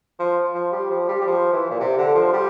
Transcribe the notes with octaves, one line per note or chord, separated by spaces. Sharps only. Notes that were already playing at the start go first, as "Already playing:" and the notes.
F3
F3
G3
F3
G3
G3
F3
E3
A#2
C3
D3
F3
G3